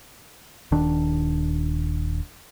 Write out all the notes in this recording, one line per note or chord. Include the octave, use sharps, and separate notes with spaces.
D#1 D#3 D4